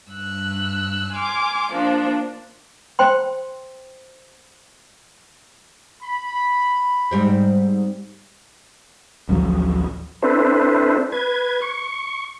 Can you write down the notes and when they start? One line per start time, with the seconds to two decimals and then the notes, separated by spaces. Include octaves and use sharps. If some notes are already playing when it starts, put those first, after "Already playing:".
0.10 G2 E6 F#6
1.13 G#5 C6 D6 F6
1.72 F3 A#3 D4
2.99 C5 G5 C6
6.02 B5
7.11 G#2 G3 C4
9.29 A1 D2 F3 F#3
10.22 C4 D4 E4 A4 B4 C5
11.12 B4 G#6
11.62 C#6